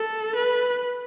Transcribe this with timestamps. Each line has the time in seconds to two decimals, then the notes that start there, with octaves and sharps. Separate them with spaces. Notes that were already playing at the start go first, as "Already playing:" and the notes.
Already playing: A4
0.35 B4